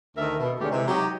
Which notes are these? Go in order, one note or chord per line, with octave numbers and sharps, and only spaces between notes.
D2 D#3 A4 A#4 E5
B2
D#2 D3 G#3 A3 C#4 G4
C3 E3 G#3
F#3 D#4 F#4 G4